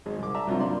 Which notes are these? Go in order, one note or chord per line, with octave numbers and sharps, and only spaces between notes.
G#1 G#3
C2 D6
D5 E5 A5 A#5
C2 C3 F#3 C4 D4 F4
G2 A#3 D4 D5 C6